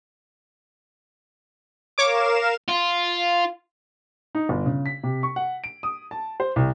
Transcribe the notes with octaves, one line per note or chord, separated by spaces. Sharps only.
A#4 C#5 F5 D6 E7
F4
D#4
G1
C#3
B6
C3
C#6
F#5
D7
D#6
A5
C5
C2